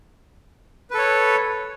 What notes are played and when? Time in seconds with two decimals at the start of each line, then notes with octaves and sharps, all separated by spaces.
0.91 B4
0.94 A4
0.98 C#5